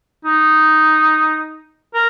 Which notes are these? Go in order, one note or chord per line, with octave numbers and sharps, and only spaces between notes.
D#4
A#4